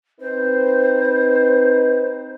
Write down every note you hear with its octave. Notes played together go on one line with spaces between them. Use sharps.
C4 D#4 B4 C5